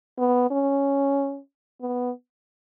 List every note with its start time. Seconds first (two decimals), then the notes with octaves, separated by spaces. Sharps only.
0.18 B3
0.51 C#4
1.81 B3